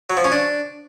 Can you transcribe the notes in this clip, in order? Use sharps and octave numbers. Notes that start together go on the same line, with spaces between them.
F#3
F3
C#4
D4